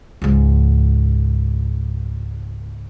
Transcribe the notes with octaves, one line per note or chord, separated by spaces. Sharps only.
C#2 G#2